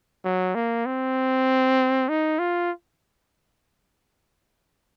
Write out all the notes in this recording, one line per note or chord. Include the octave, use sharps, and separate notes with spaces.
F#3
A#3
C4
D#4
F4